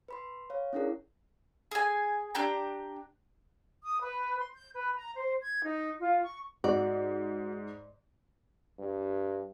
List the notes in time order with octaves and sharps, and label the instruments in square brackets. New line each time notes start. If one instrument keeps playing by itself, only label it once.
[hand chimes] B4 B5 C6
C#5 F5
C#4 D4 E4 G#4 A#4 D5
[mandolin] G#4 G#5
D4 G4 G5 A#5
[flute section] D#6
B4
C6
G6
B4
A#5
C5
G#6
D#4
F4
C#6
[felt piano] G#2 [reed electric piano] F#4 [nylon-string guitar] D5
[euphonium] G2